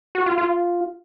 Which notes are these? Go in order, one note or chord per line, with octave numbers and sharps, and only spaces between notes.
F#4
F4
F4